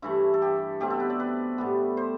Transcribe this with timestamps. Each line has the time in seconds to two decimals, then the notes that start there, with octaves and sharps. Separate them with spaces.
0.02 G2 E3 A3 E4
0.34 A4
0.42 G4
0.80 B2 A3 C4 G4
0.90 A4
1.00 B4
1.10 D5
1.20 B4
1.58 A2 G3 B3
1.97 C5